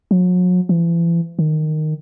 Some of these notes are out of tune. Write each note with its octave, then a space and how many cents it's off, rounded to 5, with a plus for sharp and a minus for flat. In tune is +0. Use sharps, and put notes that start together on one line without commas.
F#3 -40
E3 +40
D#3 -10